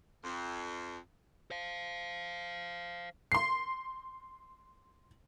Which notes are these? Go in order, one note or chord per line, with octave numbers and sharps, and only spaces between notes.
F2
C5 F5
C6 C7